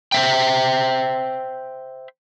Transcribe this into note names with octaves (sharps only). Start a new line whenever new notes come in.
C5 E5 G5